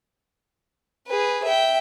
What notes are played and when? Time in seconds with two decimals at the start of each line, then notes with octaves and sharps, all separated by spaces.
1.07 G#4 B4
1.44 E5 G5